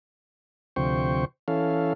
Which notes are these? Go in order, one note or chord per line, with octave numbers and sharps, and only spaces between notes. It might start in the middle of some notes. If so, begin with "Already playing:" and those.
D2 C3 F3 C5 G5 C#6
E3 C#4 A4 F5